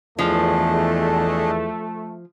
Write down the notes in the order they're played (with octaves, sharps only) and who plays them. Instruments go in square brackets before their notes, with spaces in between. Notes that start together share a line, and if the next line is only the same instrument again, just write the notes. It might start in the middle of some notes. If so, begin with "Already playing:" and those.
[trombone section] E2 [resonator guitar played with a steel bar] F3 [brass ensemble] A3 [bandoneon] D4 G#4 D#5